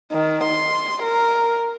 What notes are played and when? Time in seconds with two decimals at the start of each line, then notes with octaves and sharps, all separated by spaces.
0.12 D#3
0.43 C6
1.03 A#4